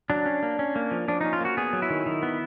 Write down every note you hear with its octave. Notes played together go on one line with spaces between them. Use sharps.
F#3 D4
C#4
A#3
C#4
A#3
F3
F3 D4
C#4 D#4
F4
A#3 F#4
B3 G#4
F#3
E4
D#3
D#3
B3